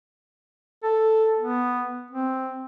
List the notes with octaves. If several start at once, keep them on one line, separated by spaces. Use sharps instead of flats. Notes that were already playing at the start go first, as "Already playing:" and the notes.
A4
B3
C4